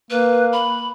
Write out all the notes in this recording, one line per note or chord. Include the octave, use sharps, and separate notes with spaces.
A#3 B4
B5